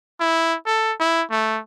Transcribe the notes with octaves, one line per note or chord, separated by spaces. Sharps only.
E4
A4
E4
A3